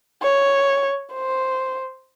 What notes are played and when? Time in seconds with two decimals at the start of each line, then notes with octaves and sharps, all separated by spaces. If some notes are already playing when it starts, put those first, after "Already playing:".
0.23 C#5
1.14 C5